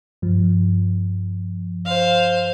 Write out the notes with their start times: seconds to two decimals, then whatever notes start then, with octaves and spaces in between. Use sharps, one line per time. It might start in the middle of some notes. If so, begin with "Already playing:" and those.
0.22 G2 F3
1.86 C5 F5